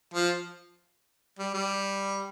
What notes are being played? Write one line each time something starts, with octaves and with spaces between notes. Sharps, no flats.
F3
G3
G3